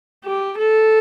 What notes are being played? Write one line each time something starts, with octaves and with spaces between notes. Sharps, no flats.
G4
A4